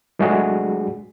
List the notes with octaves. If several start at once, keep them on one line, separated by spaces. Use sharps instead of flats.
F#3 G#3 A3 D4 F#4 G#4